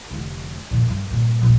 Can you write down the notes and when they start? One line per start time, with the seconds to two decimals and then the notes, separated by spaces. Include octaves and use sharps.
0.10 F1 D3
0.71 F2 A#2
0.88 G2
1.09 G2 A#2
1.41 D#1 A#1